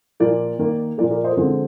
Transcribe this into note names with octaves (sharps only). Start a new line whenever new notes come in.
A#2 F3 A#3 A#4 D5
D#3 A#3
A#2 F3 A#3 A#4 D5
A#4 D5
C5 D#5
A#4
D3 F3 G#3 C4 C5